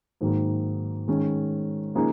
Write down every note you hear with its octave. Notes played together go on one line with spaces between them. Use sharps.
G#2 D#3 F#3 A#3
D#3 G#3 C#4
C#3 F3 A#3 D#4 G#4